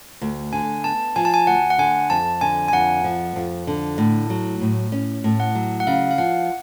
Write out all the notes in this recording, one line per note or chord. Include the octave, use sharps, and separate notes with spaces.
D2
D3 G#5
B3 A5
F3 G#5
A5
G#5
D2 F#5
F#5
D3 G#5
F2 A5
D3 G#5
G#5
F2 F#5
F3
F2
D3
A2
F#3
A2
C#4
A2
F#5
F#3
F#5
C#3 F5
F5
F3 F#5